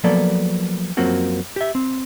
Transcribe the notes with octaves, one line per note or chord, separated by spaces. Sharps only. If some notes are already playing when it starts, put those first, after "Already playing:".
F3 F#3 A#3 B3 A4 D5
F#2 F3 F#3 A#3 C4 F#4
G4 E5
C4